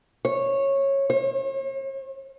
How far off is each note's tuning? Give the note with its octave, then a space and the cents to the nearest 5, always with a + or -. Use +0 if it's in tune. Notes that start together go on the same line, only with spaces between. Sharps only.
C#5 -15
C#5 -45